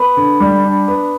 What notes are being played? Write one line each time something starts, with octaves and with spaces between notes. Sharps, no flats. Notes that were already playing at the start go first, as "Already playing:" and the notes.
Already playing: B3 B5
D3
G3
D4
B3